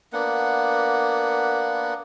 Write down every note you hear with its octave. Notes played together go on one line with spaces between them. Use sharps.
A#3 B3 D4 F#5